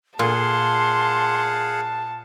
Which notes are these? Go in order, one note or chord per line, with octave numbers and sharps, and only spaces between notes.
A#2 G#4 F5 F#5 A5 C6